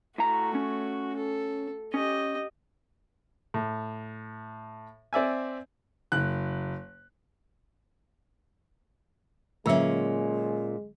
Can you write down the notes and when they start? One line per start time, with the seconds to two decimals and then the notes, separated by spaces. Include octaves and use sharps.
0.18 A2 A3 F#4 A#5
0.55 C#4
1.17 A4
1.94 C#4 G4 D#5
3.54 A2
5.13 C4 D5 E5 G#5
6.12 F#1 F#6
9.66 A#2 D3 F#3 G#3 C#4 E5